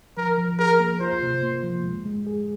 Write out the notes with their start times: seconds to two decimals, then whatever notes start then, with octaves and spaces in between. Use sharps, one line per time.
0.17 F3 A#4
0.38 F3
0.59 G#4 A#4
0.80 A#3
1.01 F4 C5
1.22 C3
1.43 A#3
1.63 F3
1.84 G#3
2.05 G#3
2.27 G#4